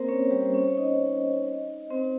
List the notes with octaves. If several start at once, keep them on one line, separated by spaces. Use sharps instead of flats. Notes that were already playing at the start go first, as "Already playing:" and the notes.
Already playing: A#3 C4 A#4 C5
C#4 C#5
G3 G4
C5
C#4 C#5
C#5
D#4 D#5
C4 C5